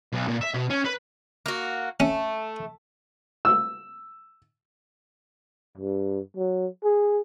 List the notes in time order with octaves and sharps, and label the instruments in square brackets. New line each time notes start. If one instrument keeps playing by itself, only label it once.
[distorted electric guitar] B1
A#2
E5
B2
C#4
B4
[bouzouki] A#3 F#4
[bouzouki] A3 [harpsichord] C#4
[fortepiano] E6
[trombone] G2
F#3
G#4